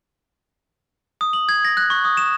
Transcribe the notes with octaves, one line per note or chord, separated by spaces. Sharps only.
D#6
F#7
G#6
A#6
F#6
C#6
D#6
E7